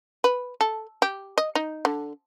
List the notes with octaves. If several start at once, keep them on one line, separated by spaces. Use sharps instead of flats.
B4
A4
G4
D#5
D#4
D3